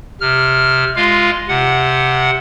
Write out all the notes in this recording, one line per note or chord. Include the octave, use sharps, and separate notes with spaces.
C3 F6
G#3 F4 F5
C3 F#5